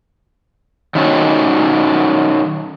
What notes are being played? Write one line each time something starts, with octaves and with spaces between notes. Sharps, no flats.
D#3 F#3 C#4